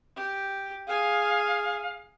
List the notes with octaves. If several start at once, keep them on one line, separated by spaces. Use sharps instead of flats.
G4
G#4 F5 G#5